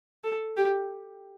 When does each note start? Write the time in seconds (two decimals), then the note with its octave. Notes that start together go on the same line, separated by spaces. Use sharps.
0.24 A4
0.57 G4